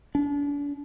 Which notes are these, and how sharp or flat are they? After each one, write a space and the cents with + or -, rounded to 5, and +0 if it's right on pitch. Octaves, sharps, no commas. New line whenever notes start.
D4 -40